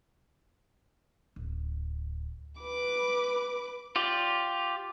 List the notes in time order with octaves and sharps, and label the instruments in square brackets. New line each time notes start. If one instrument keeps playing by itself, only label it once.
[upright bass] D1
[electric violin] B4 D6
[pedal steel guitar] F4 G4 D5